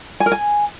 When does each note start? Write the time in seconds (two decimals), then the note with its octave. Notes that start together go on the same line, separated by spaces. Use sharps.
0.20 G#5
0.26 A#4
0.32 G#5